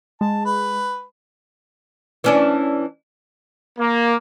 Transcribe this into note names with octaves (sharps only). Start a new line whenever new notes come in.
G#3 A5
B4
E3 C#4 D4
A#3